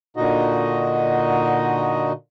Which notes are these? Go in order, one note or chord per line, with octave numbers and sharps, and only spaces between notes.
A#2 D3 D#4 F#4 D#5